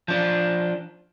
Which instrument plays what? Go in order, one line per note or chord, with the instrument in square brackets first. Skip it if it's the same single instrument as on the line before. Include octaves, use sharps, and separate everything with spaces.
[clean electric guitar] F3 D4